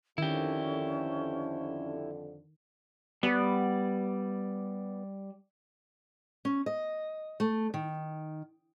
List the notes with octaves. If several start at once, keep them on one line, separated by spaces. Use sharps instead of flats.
F2 D3 D#3 C#4 E4 G4
G3 B3 D5
C#4
D#5
A3
D#3